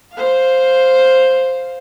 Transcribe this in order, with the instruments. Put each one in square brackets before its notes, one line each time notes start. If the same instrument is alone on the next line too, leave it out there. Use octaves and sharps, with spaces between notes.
[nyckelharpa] C5 F5